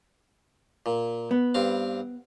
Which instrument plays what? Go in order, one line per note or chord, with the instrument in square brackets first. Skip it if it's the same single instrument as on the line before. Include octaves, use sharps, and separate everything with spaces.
[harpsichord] A#2
[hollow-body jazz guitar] B3
[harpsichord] G2 C4 F5